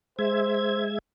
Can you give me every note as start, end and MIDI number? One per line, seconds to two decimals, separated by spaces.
0.19 0.98 56
0.19 0.87 72
0.19 0.98 76
0.19 0.98 92